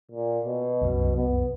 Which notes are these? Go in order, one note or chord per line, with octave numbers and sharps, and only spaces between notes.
A#2
B2
C2 F#2
B3